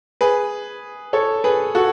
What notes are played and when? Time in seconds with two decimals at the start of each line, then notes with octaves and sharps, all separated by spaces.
0.21 G#4 B4
1.13 A4 C#5
1.44 G#4 B4
1.75 F#4 A4